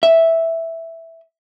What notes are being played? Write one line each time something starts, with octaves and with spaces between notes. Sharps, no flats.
E5